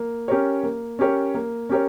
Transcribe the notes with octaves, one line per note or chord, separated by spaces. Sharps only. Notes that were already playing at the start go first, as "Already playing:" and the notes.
Already playing: A#3
C#4 G4 A#4 C#5
A#3
C#4 G4 A#4 C#5
A#3
C#4 G4 A#4 C#5